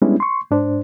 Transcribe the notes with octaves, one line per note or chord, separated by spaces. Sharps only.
G3 G#3 B3 C#4 D4 E4
C6 C#6
G#2 D4 C5